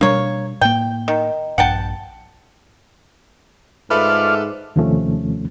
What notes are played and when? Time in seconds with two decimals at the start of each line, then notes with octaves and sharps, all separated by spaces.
0.01 B2 G3 A#3 D4 C#5
0.61 A2 A#3 G5
1.08 D#3
1.58 A#1 G2 F#5 G5 A5
3.90 G#2 A3 F4 A4 B4 D5 B5 F6
4.76 D#2 C3 D#3 F3 A3 C#4